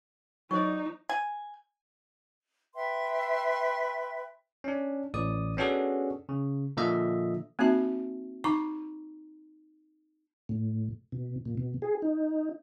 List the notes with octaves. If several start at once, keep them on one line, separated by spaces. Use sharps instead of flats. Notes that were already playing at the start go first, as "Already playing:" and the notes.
F#3 D#4 C5 D5 C#6
G#5
B4 E5 G5 C6
C#4 D4
A1 D5 D#6
B3 C#4 D4 F#4 G#4 A4
C#3
A#2 D3 F3 D#5 E5
A#3 C4 D#4 F#4 E5 A5
D#4 A#5 C#6 D6
A2
B2
A#2
B2
G#4
D#4